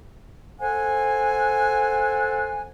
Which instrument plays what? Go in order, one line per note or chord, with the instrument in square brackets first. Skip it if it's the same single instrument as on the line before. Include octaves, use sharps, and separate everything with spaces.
[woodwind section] A4 C5 F#5 G#5